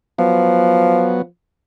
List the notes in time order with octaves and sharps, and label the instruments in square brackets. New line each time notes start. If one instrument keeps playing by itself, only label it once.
[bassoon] F3 [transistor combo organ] F#3 B3